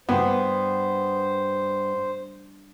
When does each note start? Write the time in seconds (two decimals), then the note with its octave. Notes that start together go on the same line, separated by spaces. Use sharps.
0.09 G2 B3 C5